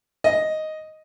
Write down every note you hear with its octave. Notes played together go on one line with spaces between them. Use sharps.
D#5